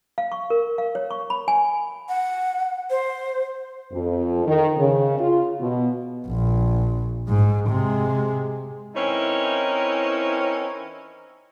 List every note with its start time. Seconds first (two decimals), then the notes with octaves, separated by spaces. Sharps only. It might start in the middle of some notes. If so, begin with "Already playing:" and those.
0.18 F5
0.32 C#6
0.50 A#4
0.78 F5
0.95 C#5
1.11 C#6
1.30 B5
1.48 G#5
2.09 F#5
2.90 C5
3.93 F2
4.46 D#3
4.78 C#3
5.19 F4
5.61 B2
6.28 A#1
7.29 G#2
7.69 C3 G#3
8.95 E3 C4 C#4 D#4 E4 A#4